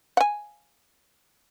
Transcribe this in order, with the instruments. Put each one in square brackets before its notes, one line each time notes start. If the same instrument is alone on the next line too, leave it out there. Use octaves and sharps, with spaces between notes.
[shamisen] F#5 G#5